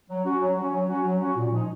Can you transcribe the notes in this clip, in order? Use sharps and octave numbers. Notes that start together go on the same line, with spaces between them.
F#3
C#4 F#4
F#3
C#4 F#4
F#3
C#4 F#4
F#3
C#4 F#4
A#2
F3 G#3 D#4